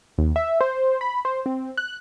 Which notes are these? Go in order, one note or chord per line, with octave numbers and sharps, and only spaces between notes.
D#2
E5
C5
B5
C5
C4
F#6